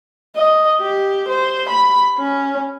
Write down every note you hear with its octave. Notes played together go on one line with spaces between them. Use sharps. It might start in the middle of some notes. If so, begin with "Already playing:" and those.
D#5
G4
C5
B5
C#4